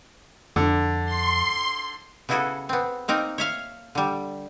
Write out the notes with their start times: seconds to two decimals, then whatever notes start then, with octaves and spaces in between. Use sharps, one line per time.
0.56 F2 D3
1.05 C6
2.29 C#3 B3 E4 F#4 G#4 A4
2.69 B3 C4
3.08 A#3 C4 D#4 A#4
3.38 C#5 E5 F5
3.95 D3 G3